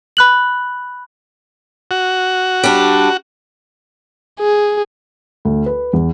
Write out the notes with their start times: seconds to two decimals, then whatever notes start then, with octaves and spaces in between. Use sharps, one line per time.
0.17 B5 F#6 F#7
1.91 F#4
2.64 G3 D4
4.40 G#4
5.45 D2
5.66 B4
5.93 E2